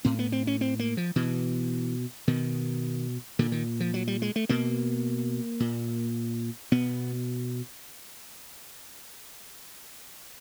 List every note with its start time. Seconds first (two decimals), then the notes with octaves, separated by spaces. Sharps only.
0.05 A2 C4
0.19 B3
0.32 C4
0.47 C#4
0.61 C4
0.79 A#3
0.97 F3
1.16 B2 E3
2.28 B2 D#3
3.39 A#2 D3
3.52 D#3
3.80 F3
3.94 F#3
4.08 G3
4.22 G#3
4.36 A3
4.49 B2 A#3
5.60 A#2
6.72 B2 B3